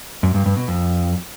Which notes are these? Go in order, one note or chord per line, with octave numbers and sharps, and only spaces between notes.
F#2
G2
G2
B2
F2